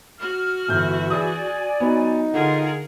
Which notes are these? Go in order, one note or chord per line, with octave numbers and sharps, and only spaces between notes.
F#4 F6
G1 E3 G6
G#4 D5 G#5 D#6
F#3 B3 D#4
D3 F4 G#4 A#4 F#5